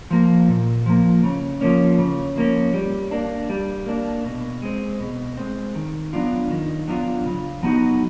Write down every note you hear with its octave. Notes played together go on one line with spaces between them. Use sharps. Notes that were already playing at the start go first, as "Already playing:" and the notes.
F3 A#3
A#2
F3 A#3
C#3
F3 A#3 C#4
C#3
F3 A#3 C#4
G3
A#3 D4
G3
A#3 D4
B2
G#3 C4
B2
G#3 C4
D#3
F#3 B3 D4 F4
D#3
F#3 B3 D4 F4
C#3
F#3 B3 D#4 F#4